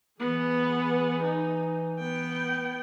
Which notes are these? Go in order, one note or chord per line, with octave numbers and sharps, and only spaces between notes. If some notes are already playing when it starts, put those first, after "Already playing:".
E3 B3 G#4
D#4
B3 G5